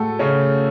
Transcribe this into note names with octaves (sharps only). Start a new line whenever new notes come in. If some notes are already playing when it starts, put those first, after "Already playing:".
Already playing: A2 G#3 A3 F#4 A4
C#3 C#4